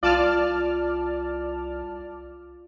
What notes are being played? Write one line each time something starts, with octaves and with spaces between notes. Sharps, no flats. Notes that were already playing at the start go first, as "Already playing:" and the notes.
C2 F4 D5 A5 F6